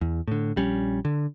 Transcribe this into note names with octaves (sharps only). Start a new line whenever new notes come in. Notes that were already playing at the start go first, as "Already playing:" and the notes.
E2
A2 D3
A#1 G3 C#4
D3